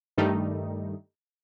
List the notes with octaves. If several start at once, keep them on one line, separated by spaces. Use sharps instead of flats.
G2 D#3 G3 A3 D#4